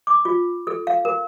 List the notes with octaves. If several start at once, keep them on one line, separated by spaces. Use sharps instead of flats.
D6
F4
A4
F5
A#4